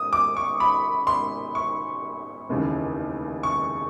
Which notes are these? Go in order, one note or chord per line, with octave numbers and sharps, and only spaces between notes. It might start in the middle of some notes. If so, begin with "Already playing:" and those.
Already playing: D#6
D6
C#6
B5
C6
C#6
F1 D#2 C#3 E3
C#6